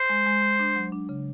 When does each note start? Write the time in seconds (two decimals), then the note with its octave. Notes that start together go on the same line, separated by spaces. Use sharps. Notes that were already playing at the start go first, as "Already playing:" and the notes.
Already playing: C5
0.09 G#3
0.26 G#3
0.42 G#3
0.59 D4
0.76 F#3
0.92 D4
1.09 C#3